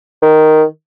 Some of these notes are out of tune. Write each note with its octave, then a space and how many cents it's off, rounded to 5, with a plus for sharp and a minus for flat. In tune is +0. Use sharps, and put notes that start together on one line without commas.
D#3 +0